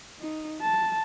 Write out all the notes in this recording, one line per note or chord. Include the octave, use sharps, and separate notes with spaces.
D#4
A5